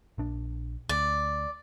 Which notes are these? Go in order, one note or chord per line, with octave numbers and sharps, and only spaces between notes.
A#1 D4
D2 D5